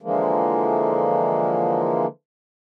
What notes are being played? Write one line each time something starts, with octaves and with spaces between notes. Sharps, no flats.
D3 E3 F3 G#3 A#3